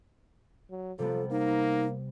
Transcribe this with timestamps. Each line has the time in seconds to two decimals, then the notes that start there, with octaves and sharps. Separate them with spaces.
0.70 F#3
0.99 C3 F3 G3 B3 A4
1.31 A#3 D#4